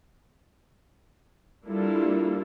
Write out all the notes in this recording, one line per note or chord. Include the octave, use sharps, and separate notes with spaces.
G3 A#3 D4 E4 F4 A4